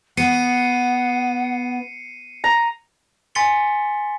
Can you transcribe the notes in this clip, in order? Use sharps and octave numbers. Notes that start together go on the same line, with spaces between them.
B3 F#5 C7 C#7 D#7
A#5
G#5 C6 A6 B6 C#7 G7